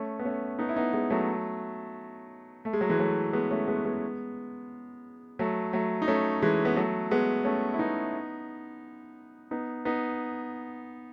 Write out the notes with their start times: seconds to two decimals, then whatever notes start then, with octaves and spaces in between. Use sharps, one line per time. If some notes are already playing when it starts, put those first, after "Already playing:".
Already playing: A3 C#4
0.19 B3
0.25 A3 C#4
0.59 B3 D#4
0.69 E4
0.76 B3 D#4
0.93 G#3 B3
1.10 F#3 A3
2.65 A3
2.73 G#3
2.81 F#3
2.90 E3 G#3
2.99 F#3 A3
3.33 G#3 B3
3.51 A3 C#4
3.68 G#3 B3
3.85 G#3 B3
5.39 F#3 A3
5.73 F#3 A3
6.02 D#4
6.08 A3 C#4
6.42 E3 G#3
6.65 B3
6.76 F#3 A3
7.11 G#3 B3
7.45 A3 C#4
7.74 E4
7.79 B3 D#4
9.51 B3 D#4
9.85 B3 D#4